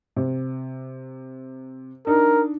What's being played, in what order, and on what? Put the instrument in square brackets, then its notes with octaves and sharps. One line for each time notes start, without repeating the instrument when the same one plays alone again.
[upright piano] C3
[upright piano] D4 D#4 [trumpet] A#4